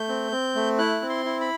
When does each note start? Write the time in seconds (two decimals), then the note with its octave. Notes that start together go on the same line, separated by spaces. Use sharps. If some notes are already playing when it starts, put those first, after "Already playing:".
Already playing: A3 G6
0.09 C4
0.32 C4
0.55 A3
0.78 E4 F#6
1.02 C4
1.09 C6
1.25 E4
1.41 B5